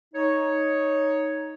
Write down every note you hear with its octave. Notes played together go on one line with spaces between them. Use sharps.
D#4 C#5